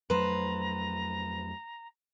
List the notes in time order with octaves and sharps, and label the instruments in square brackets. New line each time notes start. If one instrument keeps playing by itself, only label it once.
[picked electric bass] F2 F#3 A3 [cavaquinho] B4 C5 [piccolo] A#5